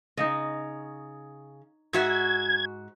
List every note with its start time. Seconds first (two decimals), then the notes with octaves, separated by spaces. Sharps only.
0.17 C#3 D#4 D#5
1.93 G#2 F#4 E5 G#6